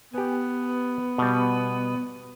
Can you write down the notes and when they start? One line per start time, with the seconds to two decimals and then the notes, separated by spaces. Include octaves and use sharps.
0.14 B3 G4 G#5
1.18 B2 G3